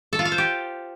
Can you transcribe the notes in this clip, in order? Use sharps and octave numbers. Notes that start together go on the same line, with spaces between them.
A4
F4
F5
C5
G4